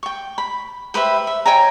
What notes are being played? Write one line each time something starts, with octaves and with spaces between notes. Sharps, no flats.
G5 C#6
B5
G4 B4 C5 E5
E5
C#5 G5 G#5 A#5